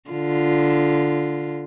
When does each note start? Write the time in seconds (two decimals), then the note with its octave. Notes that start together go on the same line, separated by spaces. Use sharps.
0.10 D3 F4